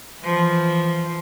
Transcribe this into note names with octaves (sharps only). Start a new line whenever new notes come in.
E3 F3